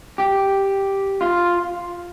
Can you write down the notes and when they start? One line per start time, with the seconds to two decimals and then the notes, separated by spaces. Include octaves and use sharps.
0.18 G4
1.21 F4